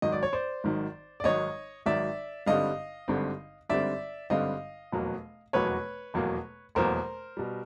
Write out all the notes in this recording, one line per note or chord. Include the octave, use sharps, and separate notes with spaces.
G#1 G#2 D#3 F#3 D#5
D5
C#5
C5 D5
G#1 G#2 D#3 F#3
D5
G#1 G#2 D#3 F#3 C#5 D#5
G#1 G#2 D#3 F#3 D5 E5
G#1 G2 D3 G3 C4 D#5 F5
G#1 G2 D3 G3 C4
G#1 G2 D3 G3 C4 D5 E5
G#1 G2 D3 G3 C4 D#5 F5
F1 E2 B2 F#3 A#3
F1 E2 B2 F#3 A#3 B4 C#5
F1 E2 B2 F#3 A#3
F1 E2 B2 F#3 A#3 A#4 C5
B2 G3